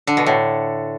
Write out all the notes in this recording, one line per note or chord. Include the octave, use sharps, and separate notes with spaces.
D3
B2
A2